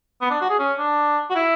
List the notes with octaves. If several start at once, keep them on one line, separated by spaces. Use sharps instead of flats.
B3
D4
F#4
G#4
C#4
D4
F#4
E4